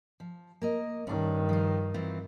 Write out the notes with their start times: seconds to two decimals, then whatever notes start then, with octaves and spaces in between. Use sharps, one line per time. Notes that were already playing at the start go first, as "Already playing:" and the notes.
0.20 F3
0.62 A#3 A#4 D#5
1.07 G2 D#3 C#4 D4
1.49 F3 F4
1.94 E3 C4 F4